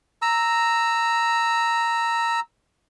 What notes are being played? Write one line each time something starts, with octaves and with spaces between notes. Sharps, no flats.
A#5 E6